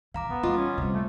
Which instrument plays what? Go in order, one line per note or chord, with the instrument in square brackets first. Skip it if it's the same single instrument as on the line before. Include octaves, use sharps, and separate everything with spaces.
[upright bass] A#2 E3 [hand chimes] F5 A#5 D6
[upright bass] F#2 [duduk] B3
[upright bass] E3 G3 [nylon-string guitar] F4 [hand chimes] D#5 F5 D6
[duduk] C#4
[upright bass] C3 G3
[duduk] A3